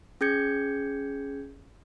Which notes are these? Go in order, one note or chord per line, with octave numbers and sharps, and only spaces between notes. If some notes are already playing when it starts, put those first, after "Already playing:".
C#4 G#4 G6 G#6 C#7